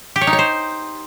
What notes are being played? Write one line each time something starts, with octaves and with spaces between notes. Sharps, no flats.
G4
C#5
D#4
C#5
C5